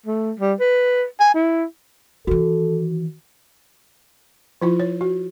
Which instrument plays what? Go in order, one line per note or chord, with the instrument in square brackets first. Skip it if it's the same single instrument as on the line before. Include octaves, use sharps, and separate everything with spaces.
[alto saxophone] A3
G3
B4
G#5
E4
[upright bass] D#3 E3 [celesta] F#4 [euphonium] A4
[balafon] F3 E4 F4
C#5
F#4